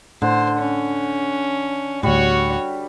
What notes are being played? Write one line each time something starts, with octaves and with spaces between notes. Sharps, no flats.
A2 D3 C5
C#4
D2 A2 G3 F#4 C#5